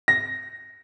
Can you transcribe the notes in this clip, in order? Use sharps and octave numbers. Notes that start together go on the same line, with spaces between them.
A#6